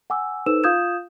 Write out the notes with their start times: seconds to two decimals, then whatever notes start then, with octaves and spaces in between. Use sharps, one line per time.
0.10 F#5 G#5 D6 E6
0.46 D#4 A4 B4 C5 E6 E7
0.64 F4 F5 D#6 G6 G#6 E7